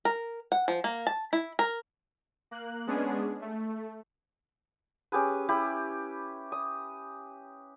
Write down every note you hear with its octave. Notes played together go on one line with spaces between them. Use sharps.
A#4
F#5
F3
A#3
A5
E4
A#4
A#3 F#6
G#3 B3 C#4 D4 G#4
A3
C#4 G4 G#4 B4
E4 G4 B5
D#6